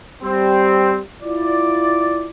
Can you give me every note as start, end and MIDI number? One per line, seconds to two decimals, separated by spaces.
0.22 0.99 55
0.22 0.99 60
1.22 2.29 64
1.22 2.29 65
1.22 2.29 74